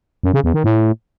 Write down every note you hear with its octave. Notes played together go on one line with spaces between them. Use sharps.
F#2
C#3
E2
D#3
A2